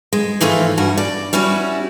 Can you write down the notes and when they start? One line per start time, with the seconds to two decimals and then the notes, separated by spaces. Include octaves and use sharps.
0.13 G#3
0.41 G#2 E3 F3 A3 F4
0.78 G2 G3 F#4 G#5
0.97 D5
1.33 G3 C#4 E4 F#4